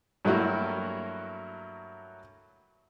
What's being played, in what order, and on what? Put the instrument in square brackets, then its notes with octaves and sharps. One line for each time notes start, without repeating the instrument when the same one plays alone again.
[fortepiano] G2 F#3 A3 A#3 E4 F#4